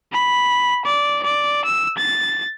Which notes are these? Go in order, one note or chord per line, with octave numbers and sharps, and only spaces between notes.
B5
D5
D5
E6
A6